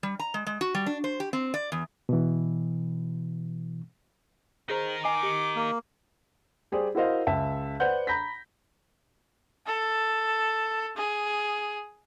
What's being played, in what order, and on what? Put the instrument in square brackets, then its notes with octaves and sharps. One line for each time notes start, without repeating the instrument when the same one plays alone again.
[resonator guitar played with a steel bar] G3
A#5
G#3
G#3
F#4
G3
D4
C5
G4
C4
D5
E2
[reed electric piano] B2 E3
[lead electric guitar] D#4 A#4 [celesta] G#4 C5 A#5
[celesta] D#5 G#5 C7 [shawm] D6
[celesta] G4 C#7
[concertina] A#3
[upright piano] G3 G4 G#4 C5 D5
E4 F#4 A#4 C5 D#5 F5
C#2 E5 A5
B4 C5 D5 F#5 G6
A#5 B5 G6 A#6 B6
[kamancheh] A4
G#4